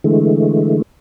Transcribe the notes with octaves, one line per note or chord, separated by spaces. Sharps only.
D3 E3 G#3 A3